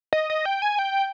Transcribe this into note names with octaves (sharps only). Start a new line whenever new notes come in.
D#5
D#5
G5
G#5
G5